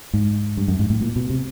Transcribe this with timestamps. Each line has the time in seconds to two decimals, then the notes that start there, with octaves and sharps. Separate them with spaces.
0.14 G#2
0.57 G2
0.68 F#2
0.79 G#2
0.90 A2
1.01 A#2
1.16 B2
1.30 C3